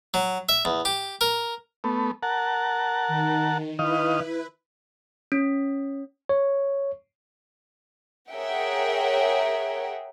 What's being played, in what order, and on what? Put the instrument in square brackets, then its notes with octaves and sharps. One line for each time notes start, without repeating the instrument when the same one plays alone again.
[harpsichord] F#3
E5
E2
G4
A#4
[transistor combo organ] A3 B3
A#4 F#5 A5
[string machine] D#3
[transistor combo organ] D#3 D#5 F5 [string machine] E4 B4
[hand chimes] C#4
[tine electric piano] C#5
[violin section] G#4 A#4 C#5 E5 F#5 G5